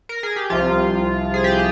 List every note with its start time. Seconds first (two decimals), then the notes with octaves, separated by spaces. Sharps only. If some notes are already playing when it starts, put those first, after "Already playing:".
0.09 A#4
0.23 G#4
0.36 G4
0.50 C2 C3 F3 F4
1.34 G#4
1.44 G4